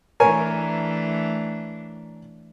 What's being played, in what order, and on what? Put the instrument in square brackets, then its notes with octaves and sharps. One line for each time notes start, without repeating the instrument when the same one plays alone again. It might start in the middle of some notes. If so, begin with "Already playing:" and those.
[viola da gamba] E3 A3 D4 [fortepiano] A#4 C#5 G#5